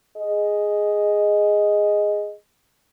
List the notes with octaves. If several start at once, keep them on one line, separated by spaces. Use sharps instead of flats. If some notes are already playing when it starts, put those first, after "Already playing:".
G#4 D#5